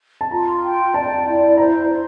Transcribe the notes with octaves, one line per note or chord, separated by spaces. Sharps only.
A5
F4 A#5
G5
D5 A5
E4
C5 A#5
C5